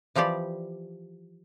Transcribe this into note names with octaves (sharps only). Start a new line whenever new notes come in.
E3 F3 G3 G4 D5